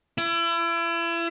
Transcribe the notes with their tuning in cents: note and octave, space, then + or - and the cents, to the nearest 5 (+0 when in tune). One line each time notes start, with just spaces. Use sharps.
E4 +35